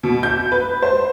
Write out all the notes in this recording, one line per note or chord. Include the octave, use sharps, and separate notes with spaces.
B2
G6
B4
C5